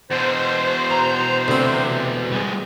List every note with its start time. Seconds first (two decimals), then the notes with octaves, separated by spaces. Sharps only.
0.10 E2 B2 C5
0.91 A#5
1.48 D2 C3 C4
2.32 G3 G#4